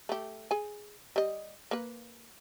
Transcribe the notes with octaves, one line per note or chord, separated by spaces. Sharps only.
A3 G4
G#4 G#5
G3 D#5
A#3 B4